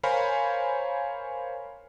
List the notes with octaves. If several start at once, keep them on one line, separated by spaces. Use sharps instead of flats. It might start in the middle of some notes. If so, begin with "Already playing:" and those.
A#4 C5 C#5 F5 G#5 B5